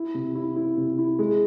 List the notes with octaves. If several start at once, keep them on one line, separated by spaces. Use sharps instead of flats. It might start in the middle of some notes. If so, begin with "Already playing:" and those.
Already playing: E4
C3
E4
E4
C3
E4
G#3